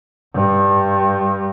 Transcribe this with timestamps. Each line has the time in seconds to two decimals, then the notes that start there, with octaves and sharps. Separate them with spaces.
0.34 G2